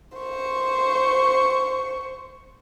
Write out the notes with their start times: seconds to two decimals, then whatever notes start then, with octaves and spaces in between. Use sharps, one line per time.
0.18 C5 C#6